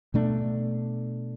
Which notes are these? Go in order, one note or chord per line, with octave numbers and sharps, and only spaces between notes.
B2 A3 D4